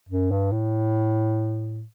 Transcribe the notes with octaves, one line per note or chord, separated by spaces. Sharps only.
F#2
G2
A2